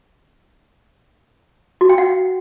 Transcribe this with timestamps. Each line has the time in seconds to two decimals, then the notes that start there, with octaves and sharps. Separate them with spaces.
1.81 F#4
1.89 G5
1.98 F#5